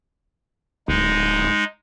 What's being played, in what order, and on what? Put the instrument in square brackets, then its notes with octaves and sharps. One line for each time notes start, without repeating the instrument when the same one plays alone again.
[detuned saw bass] D1 [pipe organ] G#3 D#4